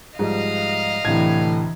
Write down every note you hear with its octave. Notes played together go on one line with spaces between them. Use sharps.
G#2 F3 G3 D#5 F5
C2 A2 D3 E3 G#6